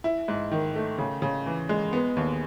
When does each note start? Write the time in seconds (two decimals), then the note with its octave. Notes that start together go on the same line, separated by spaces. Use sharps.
0.04 E4
0.28 G#2
0.51 D#3
0.76 A3
0.98 C#3
1.22 C#3
1.46 E3
1.69 G#3
1.93 B3
2.17 D#2